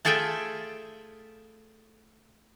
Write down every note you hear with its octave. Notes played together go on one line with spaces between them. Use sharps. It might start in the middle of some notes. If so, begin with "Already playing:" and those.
A3 F4 G#4 A4 E5 G5